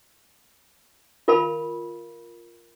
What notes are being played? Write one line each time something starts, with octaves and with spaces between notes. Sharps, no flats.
F4 A#4 F5 A5 B5